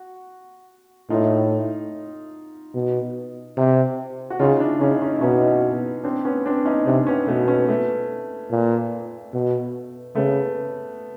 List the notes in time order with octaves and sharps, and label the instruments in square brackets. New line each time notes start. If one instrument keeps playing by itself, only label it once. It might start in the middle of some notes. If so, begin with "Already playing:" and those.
Already playing: [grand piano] F#4
[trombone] A2 [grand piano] D#4 F4
[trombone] B2
C3
[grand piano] F#4
[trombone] C#3 [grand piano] D#4 F4
[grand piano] D4 E4
[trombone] C#3 [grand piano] C#4 D#4
[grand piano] C#4 D#4
E4
[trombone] B2 [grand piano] C#4 D#4
[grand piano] C4 D4
B3 C#4
C4 D4
C#4 D#4
[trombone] C3 [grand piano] C4 D4
[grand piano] B3 C#4
[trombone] B2 [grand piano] A3 B3
[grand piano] B3 C#4
A3 B3
[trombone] A#2
B2
[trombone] C#3 [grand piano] A3 B3